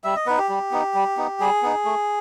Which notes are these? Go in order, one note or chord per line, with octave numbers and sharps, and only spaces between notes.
G3 E5
D#5
B3 D#4 B4
G4
G3
B3 D#4
G3
B3 D#4
G3 G#4
B3 D#4
A3